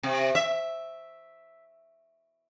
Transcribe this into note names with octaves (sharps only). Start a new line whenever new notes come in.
C3
E5